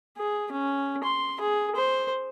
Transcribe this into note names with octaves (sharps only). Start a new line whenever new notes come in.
G#4
C#4
C6
G#4
C5